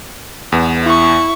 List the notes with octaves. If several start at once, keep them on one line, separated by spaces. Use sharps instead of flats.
E2 B3
E4 C#6